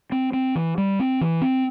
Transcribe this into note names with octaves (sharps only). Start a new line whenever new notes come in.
C4
C4
E3
G3
C4
E3
C4